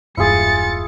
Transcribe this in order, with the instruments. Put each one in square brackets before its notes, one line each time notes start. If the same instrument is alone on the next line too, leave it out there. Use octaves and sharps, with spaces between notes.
[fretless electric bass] E1 G2 [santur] E4 F4 G#4 [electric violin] A6 C#7